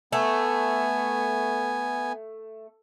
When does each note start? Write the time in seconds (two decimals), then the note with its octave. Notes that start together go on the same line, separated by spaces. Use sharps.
0.12 A3 B3 G#5